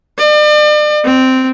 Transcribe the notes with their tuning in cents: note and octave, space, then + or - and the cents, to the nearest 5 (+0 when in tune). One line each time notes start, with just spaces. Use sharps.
D5 +40
C4 -10